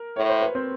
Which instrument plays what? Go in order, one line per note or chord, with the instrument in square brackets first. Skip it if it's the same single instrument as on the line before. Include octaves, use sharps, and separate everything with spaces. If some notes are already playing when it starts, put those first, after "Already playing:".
Already playing: [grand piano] A#4
[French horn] A2 [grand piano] C#5
[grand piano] C5
B4
C4 C5